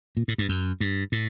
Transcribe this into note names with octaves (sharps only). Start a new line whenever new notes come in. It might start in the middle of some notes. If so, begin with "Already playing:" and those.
A#2
A2
G2
F#2
G2
A2